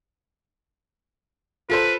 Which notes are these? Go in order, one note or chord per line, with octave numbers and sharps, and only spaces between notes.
F4 A4 B4 C5